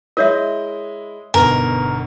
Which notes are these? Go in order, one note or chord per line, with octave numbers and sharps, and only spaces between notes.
G#3 E4 A#4 C#5 D#5 E5
G1 B2 D#4 A#4 B4